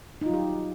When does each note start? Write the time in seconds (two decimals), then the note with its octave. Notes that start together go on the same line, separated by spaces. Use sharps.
0.22 D#4
0.26 F4
0.30 F#3
0.34 G4